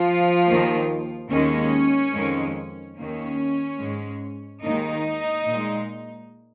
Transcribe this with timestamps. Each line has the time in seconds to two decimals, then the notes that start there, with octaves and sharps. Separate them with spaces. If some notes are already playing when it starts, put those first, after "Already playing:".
Already playing: F3 F4
0.47 D#2 D#3 A#3
1.30 D#2 D#3 G#3 C#4
2.13 F2 D#3 G#3
2.96 D#2 D#3 A#3 C#4
3.80 G#2 G#3
4.63 D#2 D#3 G#3 D#4
5.47 A#2 G#3